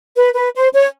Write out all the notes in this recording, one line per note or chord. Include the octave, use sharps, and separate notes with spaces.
B4
B4
C5
C#5